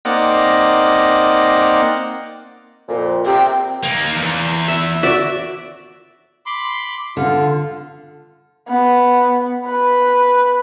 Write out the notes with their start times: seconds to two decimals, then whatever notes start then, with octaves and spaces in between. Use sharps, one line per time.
0.05 A#3 C4 D#4 D5 F#5
2.88 F2 A#2
3.26 C3 G5
3.83 D#3 A#3
4.17 E2
4.68 E5
5.03 F#4 D5 E5
6.46 B5 C6 D6
7.17 D3 F4
8.68 B3
9.66 B4